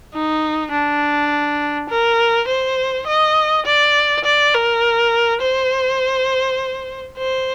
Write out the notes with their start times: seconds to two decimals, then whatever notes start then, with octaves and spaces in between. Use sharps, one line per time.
0.14 D#4
0.72 D4
1.89 A#4
2.48 C5
3.07 D#5
3.66 D5
4.25 D5
4.54 A#4
5.41 C5
7.17 C5